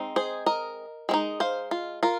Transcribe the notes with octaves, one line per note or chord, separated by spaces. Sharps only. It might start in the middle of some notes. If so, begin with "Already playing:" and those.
Already playing: G#3 C4 D#4
G#4 C5
A#4 D#5
G#3 C4 D#4
C5 F5
F4
F4 A#4